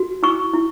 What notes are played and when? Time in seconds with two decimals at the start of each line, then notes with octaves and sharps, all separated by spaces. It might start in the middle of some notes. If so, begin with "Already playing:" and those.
Already playing: F#4
0.23 E4 C#6
0.53 E4